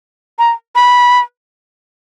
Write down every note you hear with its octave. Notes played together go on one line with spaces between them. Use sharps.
A#5
B5